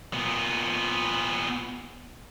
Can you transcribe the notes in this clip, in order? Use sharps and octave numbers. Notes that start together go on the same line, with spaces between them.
A#2 B3